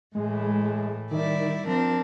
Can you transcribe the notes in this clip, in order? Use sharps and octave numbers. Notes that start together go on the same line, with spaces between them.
A2 E3 G#3
D#3 G3 E4 D5
F3 C4 D4 A#4